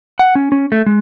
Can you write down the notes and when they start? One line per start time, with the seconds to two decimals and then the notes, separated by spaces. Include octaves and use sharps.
0.19 F#5
0.35 C#4
0.52 C#4
0.72 A3
0.86 G#3